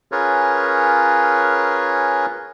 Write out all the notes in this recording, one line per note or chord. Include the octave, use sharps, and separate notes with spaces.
C#4 F4 G#4 A#4 B4 C#5